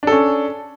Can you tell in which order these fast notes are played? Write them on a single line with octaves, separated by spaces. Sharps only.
D4 A4 C#4